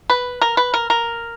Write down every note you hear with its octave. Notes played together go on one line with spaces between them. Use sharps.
B4
A#4
B4
A#4
A#4